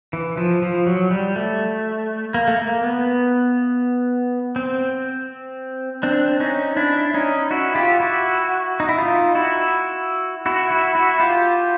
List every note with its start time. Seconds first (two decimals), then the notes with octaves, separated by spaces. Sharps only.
0.13 E3
0.37 F3
0.63 F3
0.87 F#3
1.11 G3
1.36 A3
2.34 A#3
2.48 A3
2.59 A#3
2.83 B3
4.56 C4
6.03 C4 D4
6.40 C#4 D#4
6.77 D4 E4
7.14 C#4 D#4
7.51 E4 F#4
7.75 F4 G4
8.00 E4 F#4
8.80 D#4
8.89 E4
8.98 D#4 F4
9.35 E4 F#4
10.46 E4 F#4
10.70 E4 F#4
10.95 E4 F#4
11.20 F4 G4